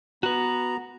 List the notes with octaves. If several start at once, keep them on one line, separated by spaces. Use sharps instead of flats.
B3 F#4 B4 A#5